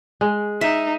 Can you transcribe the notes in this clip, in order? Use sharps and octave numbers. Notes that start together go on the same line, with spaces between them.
G#3
D#4 E5